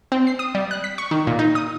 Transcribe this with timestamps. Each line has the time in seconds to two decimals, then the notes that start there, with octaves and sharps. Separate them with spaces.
0.12 C4
0.27 C7
0.39 D#6
0.55 G3
0.71 F#6
0.84 B6
0.98 C#6
1.11 D#3
1.27 A#2
1.39 D#4
1.55 D#6